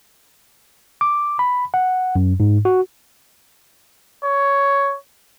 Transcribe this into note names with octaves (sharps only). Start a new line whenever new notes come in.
D6
B5
F#5
F#2
G#2
F#4
C#5